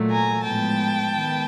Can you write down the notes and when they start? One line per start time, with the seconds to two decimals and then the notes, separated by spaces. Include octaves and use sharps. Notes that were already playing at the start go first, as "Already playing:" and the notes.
Already playing: A#2 F#3 A3
0.11 G#5 A#5
0.45 A2 F3 G#3 B3 G5 A5
1.14 D#3 G#3 B3